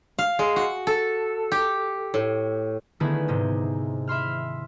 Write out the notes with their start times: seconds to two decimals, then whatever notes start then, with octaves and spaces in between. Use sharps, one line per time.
0.19 F5
0.39 G#3
0.56 F#4
0.87 A4
1.52 G4
2.14 A2
3.00 D3 D#3 A3 B3 E4 G#4
3.28 G#2 C3 G#3
4.08 E5 B5 C6 F6